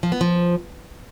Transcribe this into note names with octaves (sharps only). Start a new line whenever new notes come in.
F3
B3
F3